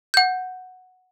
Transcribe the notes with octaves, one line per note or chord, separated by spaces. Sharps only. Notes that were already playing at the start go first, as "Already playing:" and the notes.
F#5 G6